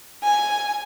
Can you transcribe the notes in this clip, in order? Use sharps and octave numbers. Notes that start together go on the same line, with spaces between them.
G#5